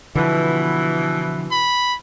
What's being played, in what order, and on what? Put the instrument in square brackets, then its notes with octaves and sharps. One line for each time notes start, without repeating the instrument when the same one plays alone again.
[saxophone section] B2 E3 [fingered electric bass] D3 F3
[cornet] B5